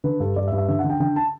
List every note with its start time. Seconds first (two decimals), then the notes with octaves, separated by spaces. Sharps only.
0.04 D3 B4
0.20 G2 A4
0.36 G2 D5
0.47 E5
0.52 G2
0.58 E5
0.68 D3 E5
0.79 F#5
0.84 D3
0.89 G5
1.00 D3 G5
1.16 A5